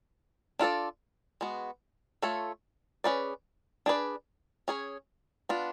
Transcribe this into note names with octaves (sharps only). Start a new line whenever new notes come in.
D4 F4 A4 D5
G#3 B3 F#4
A3 F4 A4 C#5
C#4 G#4 B4 D5
D4 G#4 B4 D5
C#4 G#4 C#5
B3 D4 F4